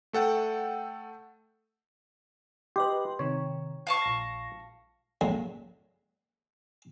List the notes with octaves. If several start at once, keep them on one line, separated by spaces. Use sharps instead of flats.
A3 A4 F#5 G5
G4 B4 D#5 C6
C3 D#3 C#5
F5 A5 C#6
A#1 A#6
C#2 F#2 A2 D3 A#3